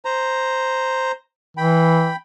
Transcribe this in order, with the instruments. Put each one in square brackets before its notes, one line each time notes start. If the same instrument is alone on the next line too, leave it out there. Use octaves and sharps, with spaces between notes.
[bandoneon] C5 A#5
[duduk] E3 [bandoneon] G5 B5